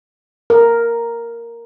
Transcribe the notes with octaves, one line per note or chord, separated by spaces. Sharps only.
A#4